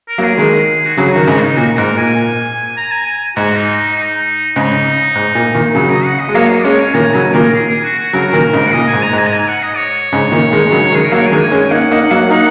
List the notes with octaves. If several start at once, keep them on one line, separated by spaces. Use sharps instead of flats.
A#4
F#3 A#3
G#4
D#3 G#3
F#4
C#3 F#3 G#4
D#3 F#4
G#2 C#3 F#4
D#4
A#2 F#4
G#2 A#4
A#2 G#5
G#5
A#5
G#5
G#5
G#2 F#4
D#4
D#4
D#4
G#2 C#3 D#4
G#2
A#2
A#2 D#3
C#3 F#3 D#4
D#5
F#5
D#5
G#3
F#3 A#3 C#5
G#4
D#5
G#3 C#4 C#5
G#5
A#2 D#3 A#5
C#3 F#3 G#5
A#2 D#3 A#4
G#4
G#4
F#4
F#4
C#3 F#3 A#4
A#2 D#3
G#2 C#3
F#5
A#2 D#5
G#5
G#2
A#5
G#2
G#5
A#5
G#5
F#5
D#5
C#5
G#2 C#3
A#2 D#3
D#3 G#3
G#3
C#3 F#3
D#3 G#3
G#4
A#4
F#3 A#3 C#5
G#5
D#3 G#3
G#5
G#3 C#4
G#5
A#3 D#4 F#5
A#3 D#4
F#5
F#3 A#3
A#3 D#4 F#5